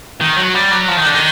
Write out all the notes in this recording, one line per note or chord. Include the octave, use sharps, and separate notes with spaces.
D#3
F#3
G3
F#3
F3
D#3
D3
D#3